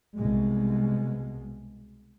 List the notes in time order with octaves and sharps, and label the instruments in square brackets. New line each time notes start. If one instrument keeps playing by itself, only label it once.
[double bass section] C2 B2 G#3